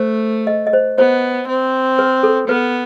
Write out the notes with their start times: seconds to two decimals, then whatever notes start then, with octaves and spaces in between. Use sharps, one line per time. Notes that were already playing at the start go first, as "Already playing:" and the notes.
Already playing: A3 C5
0.47 D#5
0.67 D#5
0.73 C5
0.98 B3 C5
1.48 C4
1.99 B4
2.23 A4
2.48 B3 B4